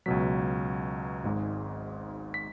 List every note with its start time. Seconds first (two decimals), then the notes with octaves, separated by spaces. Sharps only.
0.06 C#2 B2 F#3 B6
1.24 G#1 G#2 G#3
2.34 B6